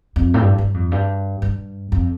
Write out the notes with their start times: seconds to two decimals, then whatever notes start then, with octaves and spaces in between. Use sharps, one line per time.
0.16 F2
0.34 A2
0.41 G2
0.58 G2
0.74 F2
0.92 G2
1.42 G2
1.92 F2